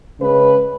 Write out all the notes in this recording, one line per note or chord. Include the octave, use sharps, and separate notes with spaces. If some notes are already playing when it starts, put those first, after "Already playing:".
C#3 G#3 C#4 B4